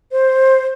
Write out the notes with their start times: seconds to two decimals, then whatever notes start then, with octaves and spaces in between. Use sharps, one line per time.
0.12 C5